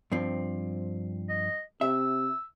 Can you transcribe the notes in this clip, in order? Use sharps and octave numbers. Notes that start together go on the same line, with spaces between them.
G2 F3 C4
D#5
C3 E5 E6